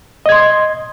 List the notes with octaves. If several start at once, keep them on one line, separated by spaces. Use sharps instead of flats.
D#5 C6 G#6